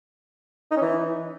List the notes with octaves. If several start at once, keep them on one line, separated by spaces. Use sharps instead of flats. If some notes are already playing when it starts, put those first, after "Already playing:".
D#4
C#4
E3